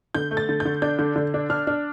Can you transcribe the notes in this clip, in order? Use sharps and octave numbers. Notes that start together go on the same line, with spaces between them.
D3 G6
A3
A6
D3
G6
D3
D4 G6
D3
D3
D4
D4 F6
D4